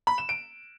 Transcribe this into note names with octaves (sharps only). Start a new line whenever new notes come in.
B5
E7
D7